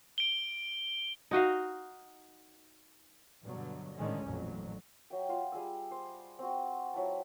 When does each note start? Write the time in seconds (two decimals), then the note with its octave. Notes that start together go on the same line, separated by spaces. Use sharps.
0.18 D7 G7
1.31 D#4 F#4 D#5 F5
3.43 G2 B2 D3 F#3
3.96 A2 D3 D#3 G#3 C#4
4.26 A1 F2 A#2 F#3
5.10 F#3 E5 G5
5.29 F4 F5
5.52 G3 G#4 G#5 E6
5.91 C5
6.39 C4 F#4
6.94 F#3 E4 F4 A5